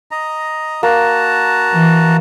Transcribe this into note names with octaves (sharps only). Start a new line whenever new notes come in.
D#5 A#5
A#3 F#4 A5 A#5
E3